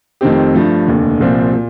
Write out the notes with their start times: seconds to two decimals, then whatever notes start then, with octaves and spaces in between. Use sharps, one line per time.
0.21 F2 D#3 A3 C4 G4
0.54 G2 F3 A3
0.87 F1 D#2 D3
1.20 C2 A#2 F3 C4
1.54 A#2